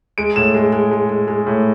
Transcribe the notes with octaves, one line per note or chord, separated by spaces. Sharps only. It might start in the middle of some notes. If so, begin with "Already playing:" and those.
G#3 D7
A2 E7
G#3
G#3
G#3
G#3
G#3
A2